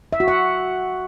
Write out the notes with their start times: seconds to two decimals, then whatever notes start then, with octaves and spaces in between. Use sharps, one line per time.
0.13 E5
0.20 F#4
0.28 F#5